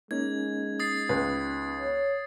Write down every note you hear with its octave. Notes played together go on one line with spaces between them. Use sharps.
G#3 A#3 C#4 D#4 G#6
D#6 A6 C7
C#2 B4
C#5